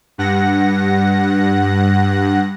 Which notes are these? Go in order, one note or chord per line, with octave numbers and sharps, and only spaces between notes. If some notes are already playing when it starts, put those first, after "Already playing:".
G2 F#5 A#6